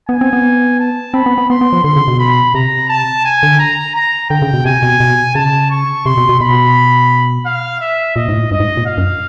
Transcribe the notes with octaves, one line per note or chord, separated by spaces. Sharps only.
B3 G#5
C4
B3
A5
C4 B5
B3
B3
B3 C6
B3
F3
D3 C6
C#3
B2
B5
C3 A#5
A5
G#5
D3
A#5
A#5
D3 G5
C#3
B2
C3 G#5
B2
B2
C#3 A5
C#6
C3 C6
B2
B2
B2 B5
F5
E5
A#2 D#5
G#2
A2
G2 D#5
G#2
A#2
F5
F#2